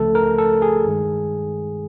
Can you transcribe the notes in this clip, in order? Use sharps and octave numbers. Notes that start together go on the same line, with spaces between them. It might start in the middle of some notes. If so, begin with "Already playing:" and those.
Already playing: C#2 C#3 F3 A3 A4
A#4
A4
G#4
G2 D#3 G#3